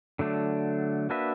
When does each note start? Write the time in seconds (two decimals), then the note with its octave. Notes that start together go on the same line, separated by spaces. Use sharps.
0.19 D3 F#3 A3 D4
1.10 A#3 D4 F#4 B4 E5